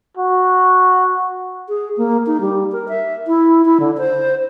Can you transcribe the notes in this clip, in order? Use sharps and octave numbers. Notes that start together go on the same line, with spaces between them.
F#4
G#4
A#3
D#4
G3
A#4
E5
E4
E4
D3
C5